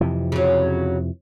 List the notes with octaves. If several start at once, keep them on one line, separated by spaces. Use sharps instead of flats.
F2 C3 E3
C#3 F#3